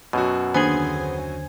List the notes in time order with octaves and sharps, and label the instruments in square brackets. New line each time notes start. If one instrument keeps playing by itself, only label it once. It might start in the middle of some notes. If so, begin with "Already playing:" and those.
[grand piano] F#2 F#3 F#4 [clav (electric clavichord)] B2
[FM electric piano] D#2 D3 G#6 [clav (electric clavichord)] B3 C4 G#4 [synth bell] C5 G#5